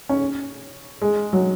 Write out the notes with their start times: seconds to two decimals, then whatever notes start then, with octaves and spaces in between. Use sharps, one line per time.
0.09 C#4
1.02 G#3
1.33 F#3